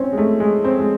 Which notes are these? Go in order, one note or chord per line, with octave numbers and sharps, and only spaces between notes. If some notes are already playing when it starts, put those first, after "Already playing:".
Already playing: C4 C#4
G#3
A3
G#3
C4
G#3